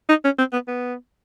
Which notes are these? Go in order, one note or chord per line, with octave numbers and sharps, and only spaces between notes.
D#4
C#4
C4
B3
B3